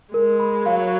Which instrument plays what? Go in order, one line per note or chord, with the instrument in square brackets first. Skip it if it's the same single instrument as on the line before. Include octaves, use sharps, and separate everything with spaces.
[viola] G#3 [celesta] A#4
[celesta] B5
[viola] F#3 [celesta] F5